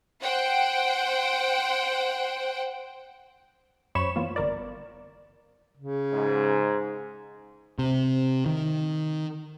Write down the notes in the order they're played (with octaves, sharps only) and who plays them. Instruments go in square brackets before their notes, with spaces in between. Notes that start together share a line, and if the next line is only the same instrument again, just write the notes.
[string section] C5 F#5 G5
[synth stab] F#2 C5 C#5 B5 C#6 E7
E3 A#3 B3 F4
G1 A#4 D5
[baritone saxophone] C#3
[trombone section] G#2
[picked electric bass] C3
D#3